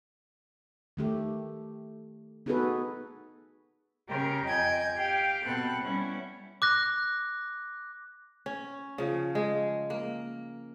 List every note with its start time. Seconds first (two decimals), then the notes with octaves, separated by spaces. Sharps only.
0.97 D#3 A3 G4
2.46 B3 D#4 F#4 G#4 A4 B4
4.08 C#3 G4 A#4
4.45 F2 D#5 G5 G#5 G6 G#6
4.95 G4 F5 G5
5.45 B2 B3 C4 A4 F#6
5.82 G3 B3 C#4 E4
6.62 D6 F#6 A#6
8.46 C#4
8.98 C#3 F3
9.35 G#3
9.90 A#3